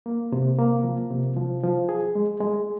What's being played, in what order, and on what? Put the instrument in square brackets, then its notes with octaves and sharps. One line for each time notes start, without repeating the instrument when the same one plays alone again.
[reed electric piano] A#3
C3
A#3
F3
C3
F3
F3
G#4
G#3
G#3